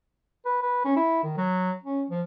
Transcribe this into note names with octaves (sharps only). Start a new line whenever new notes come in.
B4
B4
C#4
E4
D#3
F#3
C#4
F3